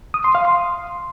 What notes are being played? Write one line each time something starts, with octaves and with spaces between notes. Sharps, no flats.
D#6
C6
F5
C6